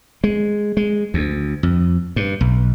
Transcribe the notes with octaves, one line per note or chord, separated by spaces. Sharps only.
G#3
G#3
D2
F2
G2
B1